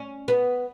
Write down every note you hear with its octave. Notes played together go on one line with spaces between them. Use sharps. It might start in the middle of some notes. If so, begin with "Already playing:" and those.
Already playing: C#4
B3